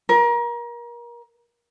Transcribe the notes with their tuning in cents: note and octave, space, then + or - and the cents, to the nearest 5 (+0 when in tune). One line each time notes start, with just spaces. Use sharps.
A#4 +30